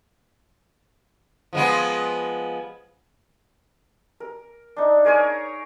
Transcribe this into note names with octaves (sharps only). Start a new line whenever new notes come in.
F3 G#3 B3
A#4
D4 D#4
G#4 A#4 C#5 G#5